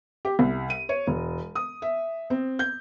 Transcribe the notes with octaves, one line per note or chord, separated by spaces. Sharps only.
G4
C2
D#7
C#5
E1
D#6
E5
C4
G6